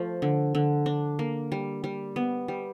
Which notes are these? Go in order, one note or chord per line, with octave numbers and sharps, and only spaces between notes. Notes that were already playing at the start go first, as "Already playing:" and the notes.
Already playing: F3 A3
D3
D3
D4
A#3
G3
G3
B3
G3